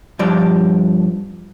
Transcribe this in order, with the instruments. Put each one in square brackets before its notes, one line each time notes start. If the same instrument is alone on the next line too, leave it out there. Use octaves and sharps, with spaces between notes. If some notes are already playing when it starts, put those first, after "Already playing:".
[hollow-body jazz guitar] G2 F3 D5